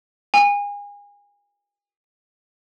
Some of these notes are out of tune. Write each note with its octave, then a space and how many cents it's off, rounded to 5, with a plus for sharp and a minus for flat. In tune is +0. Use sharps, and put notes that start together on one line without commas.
G#5 -35